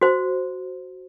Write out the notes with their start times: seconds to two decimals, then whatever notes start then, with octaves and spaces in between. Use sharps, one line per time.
0.01 F#4 C5